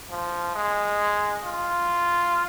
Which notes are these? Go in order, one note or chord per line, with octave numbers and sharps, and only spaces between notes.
F3
G#3
F4